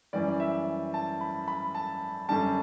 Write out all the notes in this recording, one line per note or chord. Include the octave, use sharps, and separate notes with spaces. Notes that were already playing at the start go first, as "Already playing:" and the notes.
F#2 E3 G3 D5
E5
A5
B5
B5
A5
F#2 D3 G3 A5